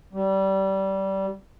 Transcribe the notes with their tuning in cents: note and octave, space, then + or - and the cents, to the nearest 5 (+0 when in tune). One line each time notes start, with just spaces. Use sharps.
G3 -20